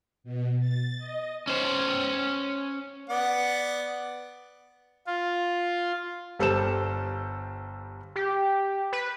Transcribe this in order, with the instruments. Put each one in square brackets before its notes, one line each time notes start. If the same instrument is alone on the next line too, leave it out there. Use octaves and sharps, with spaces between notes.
[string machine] B2
A6
D#5
[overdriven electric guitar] C#4 C5
[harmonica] B3 D5 F#5
[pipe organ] F4
[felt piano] G1 G3 A4 C5 E7
[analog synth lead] G4
B4